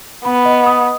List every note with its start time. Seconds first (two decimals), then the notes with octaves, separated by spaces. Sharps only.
0.25 B3 B5
0.45 D#5
0.66 D#6